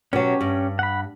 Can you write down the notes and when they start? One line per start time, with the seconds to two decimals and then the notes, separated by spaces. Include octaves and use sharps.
0.13 B2 F#3 C#4 G4 C#5
0.41 G2
0.79 F#5 B5